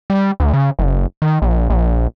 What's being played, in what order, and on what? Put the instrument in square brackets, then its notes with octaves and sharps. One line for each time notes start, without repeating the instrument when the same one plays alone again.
[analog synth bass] G3
D2
C#3
F#1
D#3
A#1
A#1